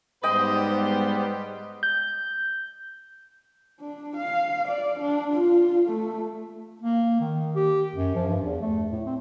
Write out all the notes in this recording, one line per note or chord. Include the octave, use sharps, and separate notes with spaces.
G#2 G3 B3 G4 C5 D#5 G5
G6
D4
F5
D5
D4
F4
A3
A#3
D#3
G4
F#2
F3
G2
E2
A3
A2
C4